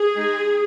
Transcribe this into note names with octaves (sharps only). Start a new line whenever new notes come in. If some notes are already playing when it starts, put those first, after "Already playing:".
Already playing: G#4
G#3 D#4